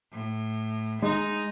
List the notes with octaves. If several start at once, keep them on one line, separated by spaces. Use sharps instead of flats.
A2
G#3 D#4